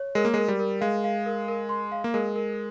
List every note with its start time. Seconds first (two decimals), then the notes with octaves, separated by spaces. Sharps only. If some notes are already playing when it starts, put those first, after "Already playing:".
Already playing: C#5
0.15 G#3 A#4
0.25 A#3
0.34 G#3 A#4
0.48 G3
0.59 A#4
0.81 G#3 F5
1.04 F5
1.26 A#4
1.48 A#4
1.69 C6
1.92 F5
2.04 A#3
2.14 G#3 A#4
2.36 A#4